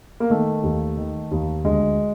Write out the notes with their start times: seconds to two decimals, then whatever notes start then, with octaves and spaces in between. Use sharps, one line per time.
0.20 A#3
0.30 D#3 A3
0.63 D#2
0.97 D#3
1.31 D#2
1.64 D2 G#3